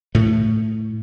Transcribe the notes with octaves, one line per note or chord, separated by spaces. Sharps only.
A2 A3